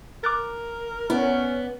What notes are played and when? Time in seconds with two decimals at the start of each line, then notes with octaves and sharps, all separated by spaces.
0.24 A#4 D6 F#6 A6
1.10 B3 C#4 E4 D5